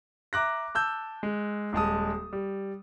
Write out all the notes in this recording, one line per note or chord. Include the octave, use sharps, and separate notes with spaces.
E5 A#5 D6 F#6 A#6
A5 E6 G6
G#3
D#1 G#3 A5 D#6
G3